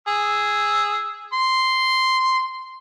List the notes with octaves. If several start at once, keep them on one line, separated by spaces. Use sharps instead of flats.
G#4 E6
C6